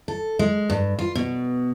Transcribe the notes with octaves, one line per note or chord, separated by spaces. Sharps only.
A4
G#3
G2
F4
B2